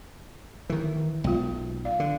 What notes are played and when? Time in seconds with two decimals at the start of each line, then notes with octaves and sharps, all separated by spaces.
0.70 D#3 E3
1.24 B1 G#3 F4
1.85 D5 F5
2.00 D3